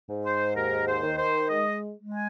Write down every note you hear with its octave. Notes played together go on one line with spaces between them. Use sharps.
G#2
C5
D#2 A#4
C5
D#3
C5
G#3 D#5
G#3
G#5